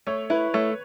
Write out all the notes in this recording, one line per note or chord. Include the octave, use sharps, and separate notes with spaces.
A3 C#5
E4 B4
A3 C#5